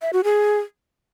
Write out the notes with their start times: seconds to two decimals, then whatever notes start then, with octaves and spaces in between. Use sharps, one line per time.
0.02 E5
0.13 F#4
0.24 G#4